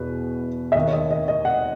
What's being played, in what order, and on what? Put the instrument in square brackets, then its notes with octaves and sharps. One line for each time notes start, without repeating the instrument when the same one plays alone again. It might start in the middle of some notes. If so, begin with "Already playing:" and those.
Already playing: [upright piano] E2 B2 B4
E5
D#2 D#3 D#5
C#5
D#5
D#5
D#5
F#5